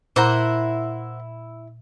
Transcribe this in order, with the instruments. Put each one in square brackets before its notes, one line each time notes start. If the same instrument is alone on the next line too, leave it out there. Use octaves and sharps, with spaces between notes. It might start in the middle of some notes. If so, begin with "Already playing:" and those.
[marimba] A#2 [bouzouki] E4 [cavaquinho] C5 F#5 A#5